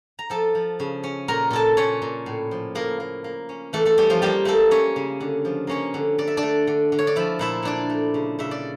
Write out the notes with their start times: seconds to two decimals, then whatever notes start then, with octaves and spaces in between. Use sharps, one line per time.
0.19 A#5
0.30 F3 A4 A5
0.55 F3
0.80 C#3
1.04 C#4
1.28 A#2 A#4 A#5
1.50 A#2 A4 A5
1.77 A#2 C#4 C#5
2.02 A#2
2.26 A2
2.51 F3
2.75 A2 A#3 A#4
3.00 A#3
3.24 A#3
3.49 C#4
3.73 E3 A3 A4
3.85 A3 A4
3.98 G3 C#4 G4
4.10 F3 F4
4.22 G3 A#3 G4
4.45 A3 A#3 A4
4.71 A#3 C#4 C#5
4.96 C#3
5.21 D3
5.45 F3
5.67 A#3 C#4 C#5
5.94 D3
6.18 D3 D5
6.27 E5
6.37 D4 D5
6.43 A3
6.67 D3
6.92 D3
6.99 C#5
7.07 D5
7.16 F3 E4 E5
7.39 A#2 E4 E5
7.63 A#2 D4 D5
7.90 A3
8.14 C#3
8.39 C#3 E5
8.51 D5